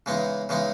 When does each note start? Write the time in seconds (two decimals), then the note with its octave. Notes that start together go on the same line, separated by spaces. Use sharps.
0.06 C#3 E3 G#3 B3 D#4
0.49 C#3 E3 G#3 B3 D#4